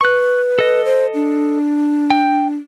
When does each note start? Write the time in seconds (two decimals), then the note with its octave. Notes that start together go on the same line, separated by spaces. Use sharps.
0.01 B4 C#6 F#6
0.59 A4 D#5
0.85 C5
1.14 D4
2.10 G5